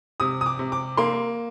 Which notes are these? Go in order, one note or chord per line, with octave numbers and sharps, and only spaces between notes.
C3 D#6
D#6
D6
C3
D6
A#3 C6